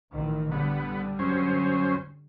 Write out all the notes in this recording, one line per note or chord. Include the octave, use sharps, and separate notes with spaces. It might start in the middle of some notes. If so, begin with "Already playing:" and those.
A1 D#3 E3
D3 G3 B3
F#2 C#4 C5